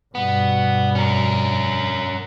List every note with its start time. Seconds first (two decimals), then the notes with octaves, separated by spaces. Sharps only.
0.15 G2 B2 B3
0.95 C#4 A#4